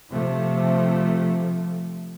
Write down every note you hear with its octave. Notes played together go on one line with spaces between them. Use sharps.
C3 F3 A3